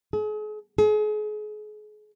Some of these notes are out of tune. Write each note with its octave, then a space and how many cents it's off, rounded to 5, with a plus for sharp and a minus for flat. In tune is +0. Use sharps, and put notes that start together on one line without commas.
G#4 +40
G#4 +35